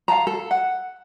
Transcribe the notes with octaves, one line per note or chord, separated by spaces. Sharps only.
F5 G5 A5 A#5
A4
F#5